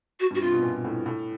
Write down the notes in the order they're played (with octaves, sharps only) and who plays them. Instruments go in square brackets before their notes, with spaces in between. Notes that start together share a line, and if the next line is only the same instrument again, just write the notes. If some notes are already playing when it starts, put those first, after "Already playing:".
[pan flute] F#4
[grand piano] G2
[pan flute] F#4
[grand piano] C3 [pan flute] F4
[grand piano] B2
A#2
A2
A2